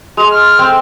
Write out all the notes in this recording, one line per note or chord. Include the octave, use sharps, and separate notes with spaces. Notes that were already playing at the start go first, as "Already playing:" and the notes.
G#3 F7
F6
C4